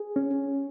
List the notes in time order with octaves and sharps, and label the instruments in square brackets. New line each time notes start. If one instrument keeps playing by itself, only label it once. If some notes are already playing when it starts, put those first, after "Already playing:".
Already playing: [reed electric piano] G#4
C#4